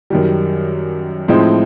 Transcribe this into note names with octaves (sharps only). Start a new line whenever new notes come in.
F#2 D#3 G3
A2 F3 G#3 C4 D#4